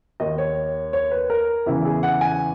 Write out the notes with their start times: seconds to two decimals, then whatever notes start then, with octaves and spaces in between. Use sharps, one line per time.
0.20 D#2 D#3 D#5
0.38 C#5
0.93 C#5
1.11 B4
1.30 A#4
1.66 E2 C#3 E3 E4
1.85 G#4
2.03 F#5
2.21 G#5